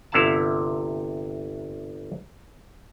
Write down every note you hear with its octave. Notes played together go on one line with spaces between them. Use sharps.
G1 C3 E4 F5 F#5 A5